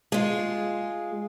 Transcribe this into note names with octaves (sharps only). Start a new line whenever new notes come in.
G#3 F4